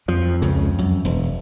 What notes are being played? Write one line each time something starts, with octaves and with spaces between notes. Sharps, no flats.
F2 F3
C#2 C#3
F#2
E1